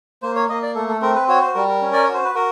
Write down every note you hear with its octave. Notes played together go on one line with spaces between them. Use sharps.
A#3 C5
C#5
A#3 D#5
D5
A3 A4
A4
C4 A#4
B4
F#4 C#5
C5
G3 A#4
A#4
C#4
D5
C#5
F#4
C5
B4
F#4 A#4